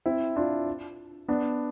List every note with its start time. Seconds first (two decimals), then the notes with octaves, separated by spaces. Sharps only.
0.06 C4 E4
0.36 D4 F4
1.28 B3 D4